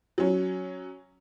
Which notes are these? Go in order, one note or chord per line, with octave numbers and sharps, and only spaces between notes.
F#3 C#4